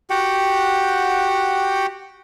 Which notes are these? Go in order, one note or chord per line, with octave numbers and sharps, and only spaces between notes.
F#4 G4 F#5 G5